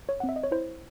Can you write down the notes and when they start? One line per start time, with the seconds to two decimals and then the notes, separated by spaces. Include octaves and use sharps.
0.09 C#5
0.20 F#5
0.24 C4
0.29 E5
0.36 D#5
0.43 C#5
0.51 E4 C5